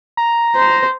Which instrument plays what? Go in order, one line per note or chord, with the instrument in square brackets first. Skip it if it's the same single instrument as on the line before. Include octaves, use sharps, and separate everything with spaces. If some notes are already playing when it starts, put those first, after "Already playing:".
[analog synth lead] A#5
[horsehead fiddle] C5